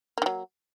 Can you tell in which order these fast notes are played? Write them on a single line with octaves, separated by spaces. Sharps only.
A#3 D#3 F#3